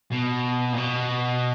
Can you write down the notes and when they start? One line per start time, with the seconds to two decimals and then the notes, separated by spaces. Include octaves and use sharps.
0.11 B2
0.73 A#2
0.77 B2